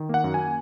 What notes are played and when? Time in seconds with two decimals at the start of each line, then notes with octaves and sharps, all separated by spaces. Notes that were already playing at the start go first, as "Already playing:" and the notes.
Already playing: D#3
0.09 A#3 F#5
0.24 F#2
0.34 G#5